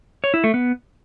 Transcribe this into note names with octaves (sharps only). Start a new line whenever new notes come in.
C#5
E4
A3
B3